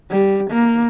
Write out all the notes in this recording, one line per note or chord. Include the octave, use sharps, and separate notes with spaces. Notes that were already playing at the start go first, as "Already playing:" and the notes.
G3
A#3